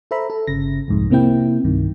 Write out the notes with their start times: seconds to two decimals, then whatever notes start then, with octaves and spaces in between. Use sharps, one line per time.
0.11 A4 C5 E5 A#5 B5
0.30 A4
0.47 G1 C#3 A#6
0.88 C2 F2 G#2
1.10 C3 A#3 C4 E4 G5
1.64 C2 G2 D#3